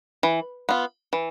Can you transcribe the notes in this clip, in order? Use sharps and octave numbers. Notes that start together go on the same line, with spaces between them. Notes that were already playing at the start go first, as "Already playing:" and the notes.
E3
B3 F4
E3